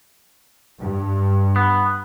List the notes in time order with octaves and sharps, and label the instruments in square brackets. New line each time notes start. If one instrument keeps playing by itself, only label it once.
[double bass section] G2
[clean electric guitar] B3